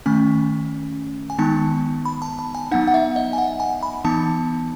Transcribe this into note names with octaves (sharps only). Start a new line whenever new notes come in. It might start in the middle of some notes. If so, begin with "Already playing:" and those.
D#3 A3 C#4 G#5
G#5
D#3 G#3 B3 D#4 A5
B5
A5
A5
G#5
F#3 B3 D#4 F#5
F#5
E5
D#5
G#5
F#5
G#5
B5
E3 B3 D#4 A5